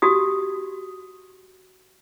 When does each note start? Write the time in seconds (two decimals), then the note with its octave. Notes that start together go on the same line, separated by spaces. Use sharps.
0.02 F#4 G4 D#6